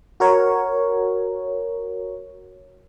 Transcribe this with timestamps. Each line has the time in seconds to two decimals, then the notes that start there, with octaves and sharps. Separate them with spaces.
0.20 F#4 A#4 C#5